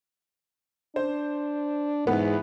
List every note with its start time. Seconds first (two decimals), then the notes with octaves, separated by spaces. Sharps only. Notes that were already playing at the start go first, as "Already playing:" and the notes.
0.96 D4 C5
2.07 E2 G#2 B3